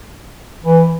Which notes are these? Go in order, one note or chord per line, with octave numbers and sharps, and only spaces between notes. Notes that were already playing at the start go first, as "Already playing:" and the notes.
E3